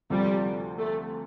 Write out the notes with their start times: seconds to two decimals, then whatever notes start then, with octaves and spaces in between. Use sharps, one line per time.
0.10 D2 C3 F3 G3 C4
0.78 A3